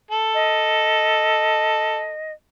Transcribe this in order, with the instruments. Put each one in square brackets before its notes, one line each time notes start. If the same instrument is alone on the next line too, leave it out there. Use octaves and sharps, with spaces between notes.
[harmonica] A4
[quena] D#5